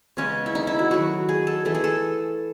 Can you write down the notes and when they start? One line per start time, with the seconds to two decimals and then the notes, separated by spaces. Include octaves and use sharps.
0.17 C#3 G#3 B3 C#4
0.46 E4
0.55 D#4
0.67 E4
0.79 F#4
0.91 D#3 F#3 A3 F#4
1.29 G#4
1.47 A4
1.65 E3 A3 A4
1.75 G#4
1.84 A4